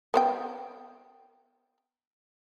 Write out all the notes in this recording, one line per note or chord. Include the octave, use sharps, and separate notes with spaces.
B3 C5 G5